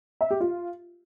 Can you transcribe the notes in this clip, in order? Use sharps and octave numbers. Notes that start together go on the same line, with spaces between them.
E5
G4
F4